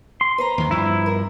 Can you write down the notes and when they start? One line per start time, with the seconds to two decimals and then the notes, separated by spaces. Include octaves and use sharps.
0.21 C6
0.38 B4 C5 A#5
0.58 D#2 D#3
0.71 G2 F3 E4
1.06 A#4